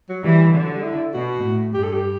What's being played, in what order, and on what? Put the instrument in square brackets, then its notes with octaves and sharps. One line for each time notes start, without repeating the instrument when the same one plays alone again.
[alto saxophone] F#3
[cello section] E3 [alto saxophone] G3
[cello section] D3
[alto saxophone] F#3
G3
E4
[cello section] B2 [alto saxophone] F#4
[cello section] A2
[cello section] G2 [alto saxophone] G4
[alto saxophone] A4
G4